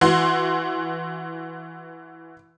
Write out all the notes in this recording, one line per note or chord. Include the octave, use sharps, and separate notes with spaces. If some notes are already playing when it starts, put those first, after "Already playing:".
E3 F#4 C6